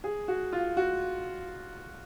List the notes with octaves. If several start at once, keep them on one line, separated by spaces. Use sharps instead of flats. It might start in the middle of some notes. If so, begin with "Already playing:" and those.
G#4
F#4
F4
F#4